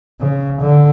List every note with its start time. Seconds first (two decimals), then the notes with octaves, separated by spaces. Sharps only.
0.21 C#3
0.61 D3